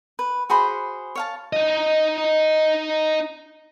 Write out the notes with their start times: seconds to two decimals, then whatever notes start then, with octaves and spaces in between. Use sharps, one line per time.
0.19 B4
0.50 F#4 G#4 C5 B5
1.15 C#5 F5 A5
1.53 D#4 D#5